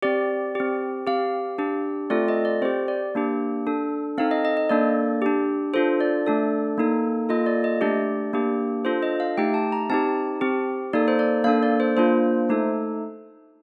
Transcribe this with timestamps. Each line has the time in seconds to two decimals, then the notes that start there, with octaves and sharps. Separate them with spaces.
0.02 C4 G4 D5
0.55 C4 G4
1.07 C4 G4 F5
1.58 D4 G4
2.10 A3 C4 F4 A4 D5
2.28 D#5
2.45 D5
2.62 C4 G4 C5
2.88 D5
3.15 A#3 D4 G4
3.67 D4 A4
4.18 C4 D#4 A4 F5
4.31 D#5
4.45 D#5
4.57 D#5
4.69 A#3 D4 A4 D5
5.22 D4 G4
5.74 D4 F4 A4 C5
6.00 D5
6.26 A3 D4 A4
6.78 A#3 D#4 A4
7.29 A#3 F4 A4 D#5
7.46 D5
7.64 D#5
7.81 A3 D4 G4 D5
8.33 A#3 D4 G4
8.85 D4 F4 A4 C5
9.03 D#5
9.20 F5
9.37 A3 D#4 G4 G5
9.54 A5
9.72 A#5
9.90 C4 D#4 G4 A5
10.41 C4 G4
10.93 A#3 D#4 A4 D5
11.08 C5
11.19 D5
11.44 A#3 D4 A4 F5
11.63 D5
11.80 C5
11.97 A#3 D4 F4 C5
12.49 A3 D#4 A4